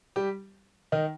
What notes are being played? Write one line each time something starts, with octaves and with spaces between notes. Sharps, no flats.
G3 G4
D#3 D#4